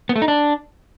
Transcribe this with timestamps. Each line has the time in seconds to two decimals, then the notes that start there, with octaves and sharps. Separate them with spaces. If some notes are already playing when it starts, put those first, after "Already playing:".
0.09 B3
0.16 A3
0.22 D#4
0.28 D4